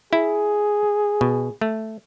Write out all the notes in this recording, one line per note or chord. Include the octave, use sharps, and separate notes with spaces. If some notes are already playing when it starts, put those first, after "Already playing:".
E4 G#4
B2
A3